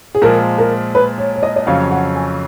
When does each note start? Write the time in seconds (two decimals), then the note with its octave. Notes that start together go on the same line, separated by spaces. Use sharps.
0.15 G#4
0.22 A#2 F3 G#3 A#4
0.58 A#4
0.95 B4
1.18 C#5
1.36 C#5
1.43 D#5
1.56 D#5
1.66 F2 C#3 F#3 C#4 F5
1.91 F#5
2.16 G#5